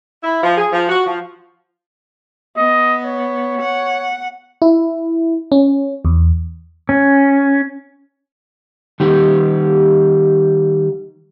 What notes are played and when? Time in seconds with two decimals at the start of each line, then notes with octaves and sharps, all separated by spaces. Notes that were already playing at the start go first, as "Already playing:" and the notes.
0.23 E4
0.43 F3
0.57 G#4
0.72 F3
0.89 F#4
1.06 F3
2.57 B3 D#5
3.05 C#5
3.61 F#5
4.62 E4
5.52 C#4
6.05 E2
6.89 C#4
9.00 D#3 G3 G4